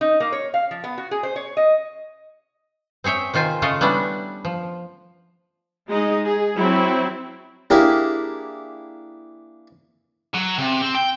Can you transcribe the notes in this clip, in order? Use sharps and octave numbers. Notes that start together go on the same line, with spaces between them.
D#4
A#3
C#5
F5
F3
B3
F#4
G#4
C5
C#5
D#5
C4 G#4 C#5 E5 G5
C3 D#3 F4 C5 G#5
C#3 A3 F4 C#5 D#5 F5
G3 B3 C#4 D4 E4
F3
G#3 D#4 D#5
G#4
F#3 C4 E4
A#3 D4 E4 G4 G#4 A#4
F#3
C3
C4
G5